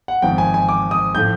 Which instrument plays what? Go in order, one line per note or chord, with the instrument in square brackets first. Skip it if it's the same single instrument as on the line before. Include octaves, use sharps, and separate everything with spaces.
[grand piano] F#5
G#1 G#2 F3 G5
G#5
G#5
D6
D#6
A2 F3 A3 G6